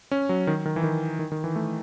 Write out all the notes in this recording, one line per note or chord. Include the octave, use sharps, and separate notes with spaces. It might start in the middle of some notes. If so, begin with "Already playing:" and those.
C#4
F#3
D#3
D#3
E3
D#3
D#3
D#3
E3
A3